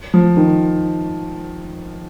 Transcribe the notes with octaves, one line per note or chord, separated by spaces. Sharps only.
F3
D#3